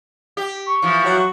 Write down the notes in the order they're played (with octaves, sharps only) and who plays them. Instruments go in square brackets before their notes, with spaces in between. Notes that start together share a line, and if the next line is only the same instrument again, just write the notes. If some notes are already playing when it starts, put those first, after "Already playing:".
[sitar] G4
[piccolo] C#6
[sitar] E3 F3
[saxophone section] F#3 F#4